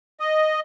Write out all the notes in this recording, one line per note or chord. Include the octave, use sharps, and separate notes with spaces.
D#5